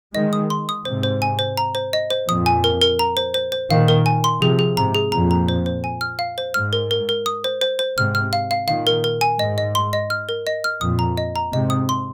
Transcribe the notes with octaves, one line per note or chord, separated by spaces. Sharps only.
D#3 G#3 D#5
D#6
C6
D#6
G#2 C3 C5
C5
G#5
C5
A#5
C5
D#5
C5
F2 A#2 D#6
G#5
A#4
A#4
A#5
C5
C5
C5
A#2 D#3 F5
A#4
G#5
C6
C3 F3 G#4
G#4
G#2 C3 A#5
G#4
F2 A#2 A#5
A#5
C5
C5
G#5
F6
F5
C5
G#2 F6
A#4
A#4
A#4
D#6
C5
C5
C5
G#2 C3 F6
F6
F5
F5
A#2 D#3 F5
A#4
A#4
G#5
G#2 D#5
D#5
C6
D#5
F6
A#4
D#5
F6
F2 A#2 D#6
A#5
D#5
A#5
G#2 C3 D#5
D#6
C6